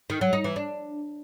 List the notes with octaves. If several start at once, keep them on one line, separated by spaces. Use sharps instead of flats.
D#3
F#3
D#4
E3
D4